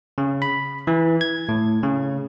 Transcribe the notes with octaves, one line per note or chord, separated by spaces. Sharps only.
C#3
B5
E3
G#6
A2
C#3